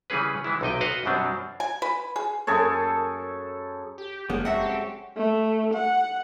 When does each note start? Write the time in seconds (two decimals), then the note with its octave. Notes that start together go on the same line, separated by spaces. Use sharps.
0.10 C#3 E3 G3 C#4 G#4 B4
0.44 E3 G#3 E4
0.61 B1 C3 D#4 D#5 G5
0.81 F#4 B4 D#5 F5 F#5
1.05 F#2 B2 F#3 G3 C4 D4
1.60 G#5
1.82 B4
2.16 G#4
2.47 F#2 G#4 A4 C#5
3.98 G4
4.30 F#1 G3 G#3 A#3 B3 C#4
4.45 F#3 C4 A4 E5 F#5
4.60 G4
5.17 A3
5.73 F#5